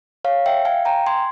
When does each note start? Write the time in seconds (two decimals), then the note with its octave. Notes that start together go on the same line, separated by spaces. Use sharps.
0.25 C#5 F5
0.46 E5 G5
0.65 F5 G#5
0.85 G5 A#5
1.07 G#5 C6